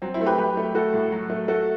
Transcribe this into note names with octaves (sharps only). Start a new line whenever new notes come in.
F#3 C4
C4 E4
A3
G4 B4
F#3 G4 B4
A3
A3 F#4 A4
A2
F#3
A3
A3 F#4 A4